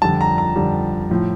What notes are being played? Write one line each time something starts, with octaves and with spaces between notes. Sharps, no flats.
F2 D3 G3 A5
A#5
A#5
F2 D3 G3
A2 F3